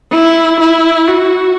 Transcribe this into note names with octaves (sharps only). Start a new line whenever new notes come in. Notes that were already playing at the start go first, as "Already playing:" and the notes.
E4
E4
F#4